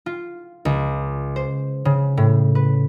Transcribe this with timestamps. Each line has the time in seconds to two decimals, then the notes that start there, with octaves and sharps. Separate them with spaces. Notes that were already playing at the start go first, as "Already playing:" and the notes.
0.06 F4
0.65 C#2
1.36 C5
1.85 C#3
2.17 A2
2.55 B4